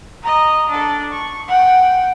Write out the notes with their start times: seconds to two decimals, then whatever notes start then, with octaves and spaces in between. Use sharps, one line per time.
0.22 D#5 A#5
0.69 D4 A4
1.12 C#6
1.47 F#5 G5